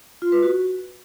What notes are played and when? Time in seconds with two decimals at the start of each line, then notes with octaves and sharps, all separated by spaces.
0.22 F4
0.32 B4
0.42 F#4